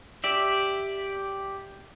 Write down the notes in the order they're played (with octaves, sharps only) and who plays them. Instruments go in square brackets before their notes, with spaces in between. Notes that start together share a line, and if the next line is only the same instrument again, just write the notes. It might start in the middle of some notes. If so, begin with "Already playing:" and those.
[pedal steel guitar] G4 D5 E5